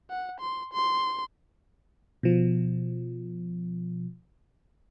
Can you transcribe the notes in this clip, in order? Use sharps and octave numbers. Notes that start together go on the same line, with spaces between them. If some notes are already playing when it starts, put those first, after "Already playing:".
F#5
C6
C6
B2 F3